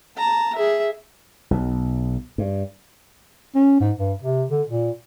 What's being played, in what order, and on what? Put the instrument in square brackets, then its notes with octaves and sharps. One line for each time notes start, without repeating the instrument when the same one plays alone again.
[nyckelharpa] A5 A#5
G#4 E5
[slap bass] B1
G2
[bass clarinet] C#4
G#2
G2
C3
D3
A#2